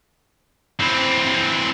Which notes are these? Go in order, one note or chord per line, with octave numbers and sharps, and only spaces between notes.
E3 C4